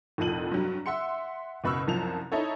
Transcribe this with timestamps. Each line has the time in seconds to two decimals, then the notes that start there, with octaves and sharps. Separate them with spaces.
0.18 F1 C2 F2 A#2 D#7 F#7
0.52 G2 F#3
0.86 E5 F#5 C6 C#7
1.64 F#1 B2 B5 C#6 E6 F6
1.87 C2 F#2 F3 A5 F7
2.32 D#4 E4 A4 C#5